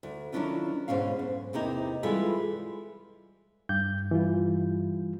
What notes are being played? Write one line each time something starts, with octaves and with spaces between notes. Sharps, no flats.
D2
D#3 F#3 C#4 D4 E4 F4
D2 G#2 B2 C#4 F5
F#2
E2 C3 A#3 D#4
E3 G3 G#3 F4 A4 B4
G2 G6
E3 G3 F4